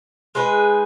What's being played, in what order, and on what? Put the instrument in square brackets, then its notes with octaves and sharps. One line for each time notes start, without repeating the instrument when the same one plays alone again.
[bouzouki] G#3 D#4 G#4 B4